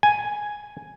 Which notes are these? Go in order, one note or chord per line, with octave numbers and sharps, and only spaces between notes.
G#5